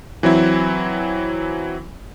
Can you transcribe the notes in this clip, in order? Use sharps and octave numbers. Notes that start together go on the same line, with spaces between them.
E3 F#3 C4 E4